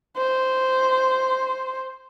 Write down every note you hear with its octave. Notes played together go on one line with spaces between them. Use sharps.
C5